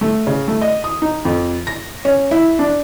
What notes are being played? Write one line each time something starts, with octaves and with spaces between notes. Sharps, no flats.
A3
C#3
A3
D#5
D#6
D#4
F2
A#6
C#4
E4
D4